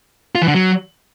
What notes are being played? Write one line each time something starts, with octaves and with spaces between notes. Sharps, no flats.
F4
E3
D3
F#3